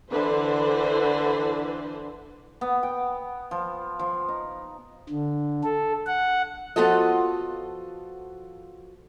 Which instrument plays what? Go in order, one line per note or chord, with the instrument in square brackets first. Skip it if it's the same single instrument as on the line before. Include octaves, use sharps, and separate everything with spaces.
[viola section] D3 E3 B4 C5
[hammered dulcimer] B3
G5
F3
F3
D#4
[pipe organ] D3
A4
F#5
[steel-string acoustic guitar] F3 B3 F4 F#4 A4 D#5